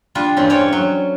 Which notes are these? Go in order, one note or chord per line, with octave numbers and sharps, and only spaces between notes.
G3 D4 F4
E2 G2 C4 C#4
C#4 A4 C#5 D5
F#3